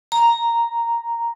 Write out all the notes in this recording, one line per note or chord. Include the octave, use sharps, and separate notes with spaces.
A#5